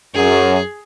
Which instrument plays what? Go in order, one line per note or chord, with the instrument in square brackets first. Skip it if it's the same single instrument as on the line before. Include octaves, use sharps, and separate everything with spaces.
[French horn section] F#2 [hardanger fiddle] G#4